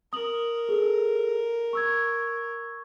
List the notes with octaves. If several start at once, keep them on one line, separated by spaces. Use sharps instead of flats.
A#4 D#6 F#7
G#4 A4
C#6 E6 G#6